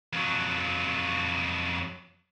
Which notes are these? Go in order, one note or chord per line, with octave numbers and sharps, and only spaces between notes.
F2 F#3